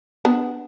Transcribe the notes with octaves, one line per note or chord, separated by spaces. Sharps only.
B3 D4